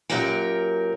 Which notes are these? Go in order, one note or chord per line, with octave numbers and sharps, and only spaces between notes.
F#2 A#2 F#3 G4 A#4 G5